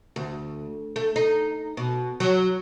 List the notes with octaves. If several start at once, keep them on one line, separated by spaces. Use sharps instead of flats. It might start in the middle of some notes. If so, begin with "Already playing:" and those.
D2
A3
D#4
B2
F#3